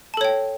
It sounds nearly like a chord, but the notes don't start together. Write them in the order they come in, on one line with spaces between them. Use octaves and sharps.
A5 A4 C#5 G5